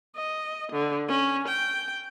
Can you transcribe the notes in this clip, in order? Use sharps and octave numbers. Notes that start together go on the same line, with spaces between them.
D#5
D3
C#4
G5